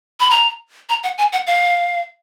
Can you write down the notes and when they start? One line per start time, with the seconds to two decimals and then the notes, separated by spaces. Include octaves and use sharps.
0.20 B5
0.30 A#5
0.89 A#5
1.03 F#5
1.18 G#5
1.33 F#5
1.47 F5